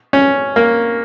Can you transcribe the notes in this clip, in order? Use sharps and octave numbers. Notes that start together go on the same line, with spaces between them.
C#4
A#3